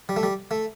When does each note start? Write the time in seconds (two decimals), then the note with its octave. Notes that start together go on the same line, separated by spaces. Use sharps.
0.09 G3
0.16 A3
0.23 G3
0.51 A3